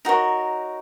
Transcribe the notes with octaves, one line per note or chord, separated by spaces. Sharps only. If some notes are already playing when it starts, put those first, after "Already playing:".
D#4 F#4 A#4 C#5